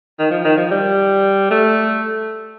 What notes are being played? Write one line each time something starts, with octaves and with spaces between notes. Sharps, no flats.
D#3
F3
D#3
F3
G3
A3